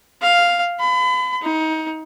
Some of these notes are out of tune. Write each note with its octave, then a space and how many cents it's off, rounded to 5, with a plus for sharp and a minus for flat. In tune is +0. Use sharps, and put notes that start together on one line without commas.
F5 +0
B5 +35
D#4 +25